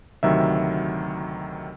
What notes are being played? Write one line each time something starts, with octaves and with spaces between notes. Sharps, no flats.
D2 C3 D#3 F#3 E5